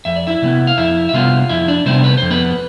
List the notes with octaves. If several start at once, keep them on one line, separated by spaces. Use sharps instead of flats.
F2 E5
D5
E4 E5
C3 G3 B3
F5
F2 E4 E5
E5
C3 G3 B3 F4 F5
F2 E4 E5
D4 D5
C3 G3 B3 C4 C5
B4
F2 C5
B3 B4